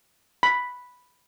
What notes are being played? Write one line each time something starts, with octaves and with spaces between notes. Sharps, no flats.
B5